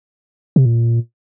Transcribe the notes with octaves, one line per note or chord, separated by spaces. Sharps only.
C3
A#2